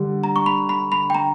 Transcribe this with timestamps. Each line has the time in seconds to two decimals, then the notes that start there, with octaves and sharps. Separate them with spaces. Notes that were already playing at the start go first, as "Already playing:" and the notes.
Already playing: D3 G3
0.24 A#5
0.36 C#6
0.46 B5
0.69 B5
0.92 B5
1.10 G5
1.15 A#5